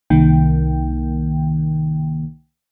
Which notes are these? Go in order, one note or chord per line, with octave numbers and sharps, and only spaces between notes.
C2 D#3 A#3 G5